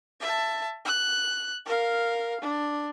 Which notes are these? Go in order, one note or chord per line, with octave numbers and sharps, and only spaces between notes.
E5 A5
F#6
A#4 F5
D4